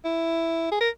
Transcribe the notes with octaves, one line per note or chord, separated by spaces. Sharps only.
E4
G#4
A#4